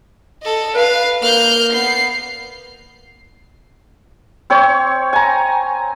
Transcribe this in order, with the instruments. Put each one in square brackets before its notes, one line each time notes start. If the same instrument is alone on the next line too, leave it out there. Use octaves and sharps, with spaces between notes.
[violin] A4 D#5
[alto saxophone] B4 [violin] F5
[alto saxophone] A#3 [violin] F6 G6
[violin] B3 C7
[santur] C4 C#5
G#5 A#5